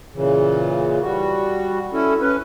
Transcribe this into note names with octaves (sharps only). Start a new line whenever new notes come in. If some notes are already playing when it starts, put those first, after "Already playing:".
A#2 C#3 E3
G3 F#4
C#4 E4 A4
C#4 B4